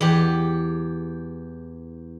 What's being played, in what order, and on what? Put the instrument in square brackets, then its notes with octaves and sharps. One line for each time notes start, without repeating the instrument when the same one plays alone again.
[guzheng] E2 G4